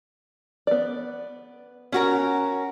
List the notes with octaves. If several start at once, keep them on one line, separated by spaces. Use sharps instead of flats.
B3 D5
C#4 F#4 A#4